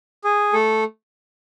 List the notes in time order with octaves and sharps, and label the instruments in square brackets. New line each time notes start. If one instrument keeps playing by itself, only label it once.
[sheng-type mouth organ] G#4
A3 A4